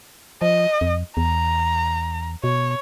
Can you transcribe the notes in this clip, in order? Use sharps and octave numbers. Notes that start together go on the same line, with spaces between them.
F3 D#5
F2
E2 A#5
B2 C#5